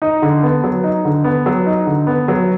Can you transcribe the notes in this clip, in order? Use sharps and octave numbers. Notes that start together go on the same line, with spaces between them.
D#4
D3
B3
F#3
D#4
D3
B3
F#3
D#4
D3
B3
F#3